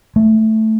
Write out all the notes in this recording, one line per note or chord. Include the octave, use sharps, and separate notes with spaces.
A3